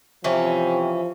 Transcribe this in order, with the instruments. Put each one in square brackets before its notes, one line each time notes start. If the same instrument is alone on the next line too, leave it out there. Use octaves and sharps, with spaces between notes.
[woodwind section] C3 [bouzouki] E3 C#4 [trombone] F3